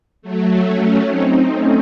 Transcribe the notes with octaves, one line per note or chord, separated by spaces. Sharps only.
F#3 A3
A3 C#4
C4 D#4
A3 C#4